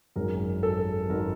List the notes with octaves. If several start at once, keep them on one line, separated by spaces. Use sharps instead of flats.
G#1 F#2 D#3 G#3 A#4
A4
G#1 D#3 G#3 A#4